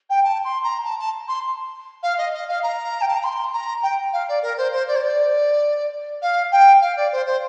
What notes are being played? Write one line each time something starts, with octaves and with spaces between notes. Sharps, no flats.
G5
A5
C6
A#5
A5
A5
C6
F5
D#5
D#5
F5
A#5
G5
A5
A#5
C6
A#5
G5
F5
D5
A#4
C5
C5
D5
C5
D5
F5
G5
F5
D5
C5
C5